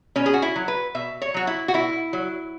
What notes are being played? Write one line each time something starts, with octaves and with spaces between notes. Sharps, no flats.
B2 C#4
G#4
F#4
E4
F#3
B4
B2 E5
C#5
F#3 F#4
E4
F#4
B2 E4
F#3